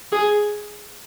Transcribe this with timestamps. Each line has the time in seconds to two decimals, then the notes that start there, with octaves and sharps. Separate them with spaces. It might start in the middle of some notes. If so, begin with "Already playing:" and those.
0.12 G#4